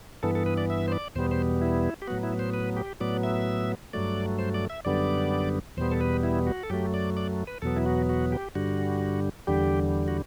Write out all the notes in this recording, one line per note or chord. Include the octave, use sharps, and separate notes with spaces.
G2 E3 B3 A4
A4
B4
D5
E5
C5
D5
E2 B2 G3 B3 C5
C5
E4
G4
A2 F#3 B3 F#4
E4
C5
B4
G4
A2 F#3 B3 D5
E5
G2 F#3 A3 D5
C5
D5
E5
F#2 D3 G3 B3 D5
E2 B2 G3 B3 C5
A4
B4
E4
F#4
A4
F#2 F#3 A3 G4
D5
D5
B4
E2 B2 F#3 B3 A4
E4
F#4
F#4
G4
G2 D3 G3 F#4
E2 D3 G3 G4
F#4